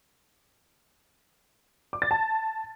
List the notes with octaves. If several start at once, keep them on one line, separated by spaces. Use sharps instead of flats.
D6
A6
A5